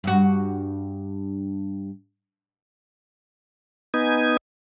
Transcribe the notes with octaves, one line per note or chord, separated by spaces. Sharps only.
G2 F#4
B3 D#4 G#5